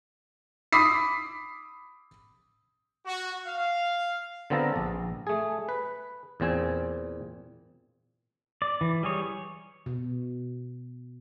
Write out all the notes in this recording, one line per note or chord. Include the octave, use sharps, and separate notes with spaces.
B5 D6 D#6 B6 C7
F#4
F5
D3 B3 C4 F4 A4 A#5
A#1
A3 G#4
B4
E2 A#2 C4 G#5
D5
E3
G3 G#4 C#5
B2